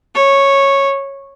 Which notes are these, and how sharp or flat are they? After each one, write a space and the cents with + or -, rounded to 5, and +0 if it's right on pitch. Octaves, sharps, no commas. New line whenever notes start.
C#5 -10